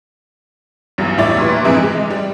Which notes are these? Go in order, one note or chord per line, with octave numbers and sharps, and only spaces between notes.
B1 E2 G2 F#3
A2 G3 E4 C#5 D6 A6
A#2 E3
F2 G#2 C3 E3 G#4 E5
G#3
G3